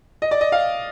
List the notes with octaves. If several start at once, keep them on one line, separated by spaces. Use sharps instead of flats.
D#5
D5
D#5
F5